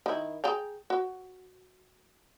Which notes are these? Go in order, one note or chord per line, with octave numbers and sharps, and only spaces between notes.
D#3 E4
G#4 G5 A#5
F#4